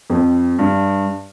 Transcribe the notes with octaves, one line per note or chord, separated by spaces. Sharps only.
F2
G2